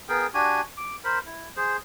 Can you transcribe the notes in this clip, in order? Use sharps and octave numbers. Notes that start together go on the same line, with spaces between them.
B3 G#4 A#4 G5
D4 F#4 G4 G#5
D6
A#4 C5 B5
E4
G#4 C5